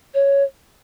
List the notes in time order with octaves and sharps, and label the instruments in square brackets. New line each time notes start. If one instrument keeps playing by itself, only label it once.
[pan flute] C#5